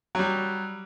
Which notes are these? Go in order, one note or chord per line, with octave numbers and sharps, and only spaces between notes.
F#3 G3